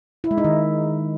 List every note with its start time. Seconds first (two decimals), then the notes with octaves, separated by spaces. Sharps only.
0.24 E4
0.31 G#3
0.38 D#4
0.44 D#3